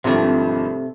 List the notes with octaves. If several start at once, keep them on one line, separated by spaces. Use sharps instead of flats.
G#1 G2 C3 F3 A3